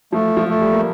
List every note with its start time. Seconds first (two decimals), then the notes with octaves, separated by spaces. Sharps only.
0.12 F3 A3
0.37 F3
0.48 A3
0.60 G3
0.73 A#3